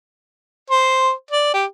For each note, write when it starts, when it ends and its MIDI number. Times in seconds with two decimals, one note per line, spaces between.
0.70 1.12 72
1.31 1.51 74
1.54 1.66 67